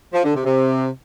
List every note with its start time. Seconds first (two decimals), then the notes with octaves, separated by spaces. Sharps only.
0.13 F3
0.24 D3
0.34 C3
0.45 C3